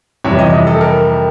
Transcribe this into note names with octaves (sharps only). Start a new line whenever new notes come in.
F2 C3 E3 G3 C#5
D#5
D#5
A4
A#4